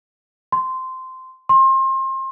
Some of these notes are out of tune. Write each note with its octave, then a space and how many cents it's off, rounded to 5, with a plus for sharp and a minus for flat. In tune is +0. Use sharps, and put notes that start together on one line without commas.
C6 -10
C6 +30